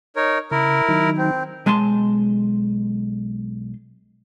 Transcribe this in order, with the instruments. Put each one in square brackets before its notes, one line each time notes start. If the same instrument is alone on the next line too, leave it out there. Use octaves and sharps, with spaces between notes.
[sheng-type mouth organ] D#4 A#4 C#5
[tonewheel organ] C#3 [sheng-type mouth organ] E4 A#4
[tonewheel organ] D#3 F#3 D#4
[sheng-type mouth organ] C4
[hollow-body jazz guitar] B1 G#3 G#5 A5 C6